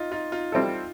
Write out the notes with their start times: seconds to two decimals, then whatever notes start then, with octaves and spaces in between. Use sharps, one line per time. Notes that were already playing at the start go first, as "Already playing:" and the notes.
Already playing: D#4 F4
0.12 D#4 F4
0.32 D#4 F4
0.52 G3 C4 E4 A4